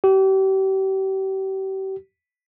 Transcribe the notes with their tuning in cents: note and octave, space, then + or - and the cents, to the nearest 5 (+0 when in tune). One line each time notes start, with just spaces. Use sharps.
G4 -35